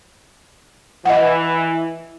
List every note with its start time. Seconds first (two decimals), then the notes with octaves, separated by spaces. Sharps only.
1.05 E3 D#5 F#5